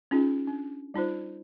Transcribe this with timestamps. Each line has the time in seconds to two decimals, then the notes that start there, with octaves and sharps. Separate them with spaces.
0.11 C#4 D#4 F4 G#4
0.47 D4
0.94 G3 D#4 F4 C5